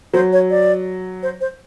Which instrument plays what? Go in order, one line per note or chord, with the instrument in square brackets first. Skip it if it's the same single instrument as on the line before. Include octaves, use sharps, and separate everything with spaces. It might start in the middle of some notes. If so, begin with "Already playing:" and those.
[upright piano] F#3 [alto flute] C5
[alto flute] C#5
D5
C5
C5